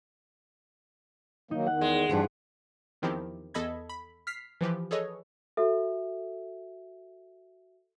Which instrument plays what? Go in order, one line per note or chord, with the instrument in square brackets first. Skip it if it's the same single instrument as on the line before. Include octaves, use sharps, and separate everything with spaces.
[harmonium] D#3 F#3 A#3 [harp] D#4
[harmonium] E2 D#3 [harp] F#5
[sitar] G#3
[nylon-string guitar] G2 E3 F3 [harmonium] D4 G4
[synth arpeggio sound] E2 D#3 F3 C4 E4 G4
E2 A4 D#5 B5 G#6
B5
F6 B6 C7
E3 F3 G4 B4
G#4 A4 B4 C#5 D#5
[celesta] F#4 E5 [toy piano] A4